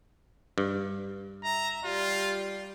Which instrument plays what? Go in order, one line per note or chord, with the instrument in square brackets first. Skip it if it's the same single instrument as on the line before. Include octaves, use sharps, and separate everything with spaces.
[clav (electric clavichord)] G2
[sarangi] E5 [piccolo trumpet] A#5
[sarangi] G3 [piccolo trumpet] F4